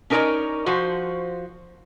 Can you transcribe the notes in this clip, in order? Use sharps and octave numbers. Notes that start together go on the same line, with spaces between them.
C#4 D#4 A#4 B4 C#5 D5
F3 F#4 C5